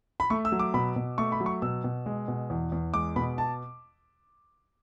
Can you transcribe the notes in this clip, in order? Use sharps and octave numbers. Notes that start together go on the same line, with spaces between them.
B5
A3 C#6
E6
F#3
D6
B2 B5
B2
A3 C#6
B5
F#3
C#6
B2 E6
B2
G#3
B2
E2
E2
G#3 D6
B2 B5
A5